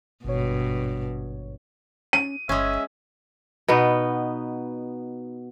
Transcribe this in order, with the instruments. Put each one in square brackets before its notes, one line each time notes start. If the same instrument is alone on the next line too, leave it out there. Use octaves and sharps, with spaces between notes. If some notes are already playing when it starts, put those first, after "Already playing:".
[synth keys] G#1 C#5 [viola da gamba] G2 B2
[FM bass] C#4 [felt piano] D#7
[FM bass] G1 [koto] G#3 C#4 [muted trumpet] E5
[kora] B2 B3 D#4